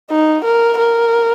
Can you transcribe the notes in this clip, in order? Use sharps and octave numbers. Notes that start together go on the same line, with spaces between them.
D#4
A#4
A#4